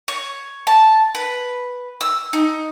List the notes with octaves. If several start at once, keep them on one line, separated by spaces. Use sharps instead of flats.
C#5
A5
B4
E6
D#4